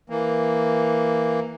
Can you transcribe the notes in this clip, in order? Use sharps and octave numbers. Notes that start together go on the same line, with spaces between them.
E3 A#3